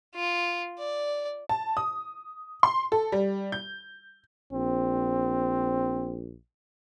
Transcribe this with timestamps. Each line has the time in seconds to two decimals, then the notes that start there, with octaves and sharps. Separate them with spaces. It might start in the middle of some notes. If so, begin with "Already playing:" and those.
0.16 F4
0.79 D5
1.49 A5
1.77 D#6
2.63 C6
2.92 A4
3.12 G3
3.52 G6
4.53 A#1 C4